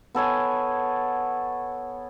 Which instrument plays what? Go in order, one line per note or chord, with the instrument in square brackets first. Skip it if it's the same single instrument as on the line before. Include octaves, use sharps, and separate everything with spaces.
[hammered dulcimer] B3 A4 C#5 G#5